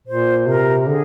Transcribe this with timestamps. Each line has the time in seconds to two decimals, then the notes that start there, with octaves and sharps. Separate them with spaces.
0.07 A#2 C5
0.47 C3 A#4
0.87 D3 G#4